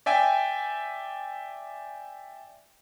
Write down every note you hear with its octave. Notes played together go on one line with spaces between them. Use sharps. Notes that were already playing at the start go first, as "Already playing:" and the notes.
D5 E5 G5 G#5